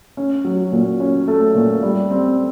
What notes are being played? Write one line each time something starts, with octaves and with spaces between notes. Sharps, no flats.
C#4
F#3
A#2
C#4
A3
A#2
G3
C4